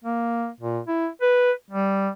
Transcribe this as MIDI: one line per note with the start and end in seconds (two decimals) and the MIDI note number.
0.04 0.49 58
0.60 0.80 46
0.88 1.08 64
1.22 1.52 71
1.71 2.09 55